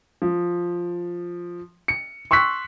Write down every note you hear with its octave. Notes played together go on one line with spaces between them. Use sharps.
F3
C#7
C6 C#6 E6 F#6 B6